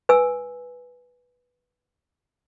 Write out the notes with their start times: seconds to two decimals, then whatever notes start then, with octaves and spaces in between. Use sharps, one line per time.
0.09 B4 G#5 E6